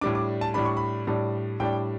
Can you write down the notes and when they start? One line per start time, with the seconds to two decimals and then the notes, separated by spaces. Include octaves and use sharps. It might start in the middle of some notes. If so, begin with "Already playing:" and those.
0.01 A2 G3 D4 D6
0.15 D6
0.41 A5
0.54 A2 G3 D4 B5
0.65 C#6
0.77 B5
1.07 A2 G3 D4
1.60 A2 G3 D4 G5